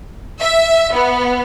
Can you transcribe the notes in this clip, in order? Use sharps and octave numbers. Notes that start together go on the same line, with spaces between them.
E5
B3